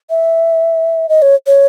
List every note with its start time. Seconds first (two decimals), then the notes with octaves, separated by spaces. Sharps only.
0.10 E5
1.09 D#5
1.22 C#5
1.47 C#5